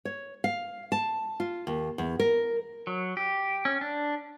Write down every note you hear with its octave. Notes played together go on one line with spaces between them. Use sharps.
C#5
F5
A5
F4
D#2
E2
A#4
F#3
G4
C#4
D4